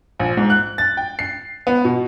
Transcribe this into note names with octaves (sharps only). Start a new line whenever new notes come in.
A#1
G#2
F#6
A6
G5
C7
B3
B2